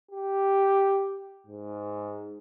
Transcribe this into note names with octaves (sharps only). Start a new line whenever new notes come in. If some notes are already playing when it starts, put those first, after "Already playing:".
G4
G#2